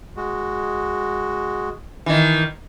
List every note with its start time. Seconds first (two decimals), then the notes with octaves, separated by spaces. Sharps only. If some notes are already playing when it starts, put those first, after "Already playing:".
0.17 G#3 F#4
2.06 D#3 E3